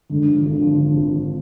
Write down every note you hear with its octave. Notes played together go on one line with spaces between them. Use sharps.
G#2 D3
F3
G#1 D3
F3
D3 F3
G#1
G#1